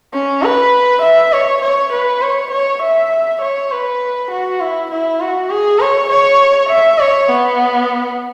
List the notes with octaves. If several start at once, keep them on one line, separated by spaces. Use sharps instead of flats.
C#4
B4
E5
C#5
C#5
B4
C#5
C#5
E5
C#5
B4
F#4
E4
E4
F#4
G#4
C#5
C#5
E5
C#5
B3